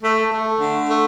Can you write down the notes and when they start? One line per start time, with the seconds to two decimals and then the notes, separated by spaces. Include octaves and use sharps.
0.02 A3
0.31 A3
0.60 D3
0.90 A3